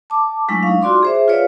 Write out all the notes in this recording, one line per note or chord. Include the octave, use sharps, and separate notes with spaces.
A5 D6
F#3 G#3 A3 D4 E4 C#6
D#4 F5
F4 F#4 D5 C6 D6
G#4 C5 E5
F4 G#4 B4 C#5 D5 F5